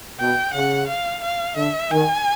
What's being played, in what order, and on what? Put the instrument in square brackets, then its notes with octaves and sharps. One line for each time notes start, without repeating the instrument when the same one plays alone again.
[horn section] B2 [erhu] G5
[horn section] C#3 [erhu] F#5
[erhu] F5
F5
[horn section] D3 [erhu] E5
[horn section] D#3 [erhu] G#5